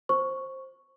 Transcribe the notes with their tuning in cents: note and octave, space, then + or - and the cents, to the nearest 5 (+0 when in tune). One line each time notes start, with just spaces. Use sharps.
C5 +15 C#6 +0